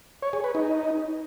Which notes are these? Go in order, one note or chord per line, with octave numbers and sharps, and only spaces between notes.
C#5
G#4
B4
D#4